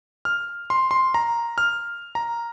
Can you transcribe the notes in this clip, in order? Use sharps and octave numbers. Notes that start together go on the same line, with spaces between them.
F6
C6
C6
A#5
F6
A#5